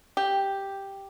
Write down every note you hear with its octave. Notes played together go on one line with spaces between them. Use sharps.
G4